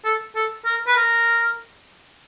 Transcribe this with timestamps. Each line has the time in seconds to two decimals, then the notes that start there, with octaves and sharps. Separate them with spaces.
0.05 A4
0.36 A4
0.65 A#4
0.87 B4
0.96 A#4